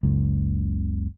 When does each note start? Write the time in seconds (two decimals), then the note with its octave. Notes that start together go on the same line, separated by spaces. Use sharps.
0.03 F#1 C#2